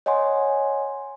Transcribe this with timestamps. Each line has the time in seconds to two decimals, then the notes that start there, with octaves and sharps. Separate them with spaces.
0.06 C#5 D#5 F#5 G#5 C6